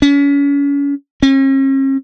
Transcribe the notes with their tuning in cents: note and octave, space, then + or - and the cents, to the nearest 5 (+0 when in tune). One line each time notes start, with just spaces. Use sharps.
C#4 +35
C#4 -45